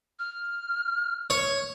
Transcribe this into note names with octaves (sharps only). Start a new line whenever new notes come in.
F6
C#5